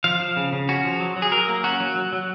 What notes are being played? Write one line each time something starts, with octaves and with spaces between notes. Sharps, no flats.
F3 F5
F3
C#3
C#3
C#4 F#4
F3
F#3
F#3
G#4
F#3 A#4
A#3
C#4 F#4
F#3
F#3
F#3